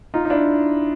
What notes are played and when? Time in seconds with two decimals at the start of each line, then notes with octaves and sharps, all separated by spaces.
0.14 D#4 F4
0.25 D#4
0.30 D4 E4